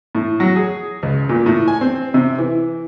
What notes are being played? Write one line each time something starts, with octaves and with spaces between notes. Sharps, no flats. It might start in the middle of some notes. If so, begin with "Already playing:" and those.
A2
F#3
G#4
C#2
A#2
A2
G#5
C4
C3
E3